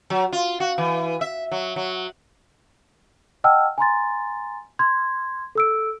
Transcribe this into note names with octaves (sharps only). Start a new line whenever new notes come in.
F#3
F4
F#4
E3
E5
F#3
F#3
D#5 F#5 G5 A5 E6 F6
G#5 A#5 C6 A6
C6 G#6
A4 E6 D7